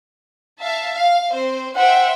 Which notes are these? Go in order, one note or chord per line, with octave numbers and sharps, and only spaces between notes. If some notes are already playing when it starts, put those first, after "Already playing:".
E5 F5 A5
F5
C4 C5
C5 E5 F#5 G5